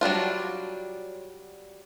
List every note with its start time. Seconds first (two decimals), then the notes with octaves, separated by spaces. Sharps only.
0.01 F#3 G3 D4 F4